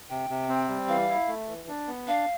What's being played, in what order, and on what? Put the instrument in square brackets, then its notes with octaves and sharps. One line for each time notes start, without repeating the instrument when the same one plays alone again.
[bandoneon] C3 [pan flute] G5
[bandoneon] C3
C4
G3
[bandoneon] E3 [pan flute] F5
[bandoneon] E4
A3
E3
D4
B3
[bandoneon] D4 [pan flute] F5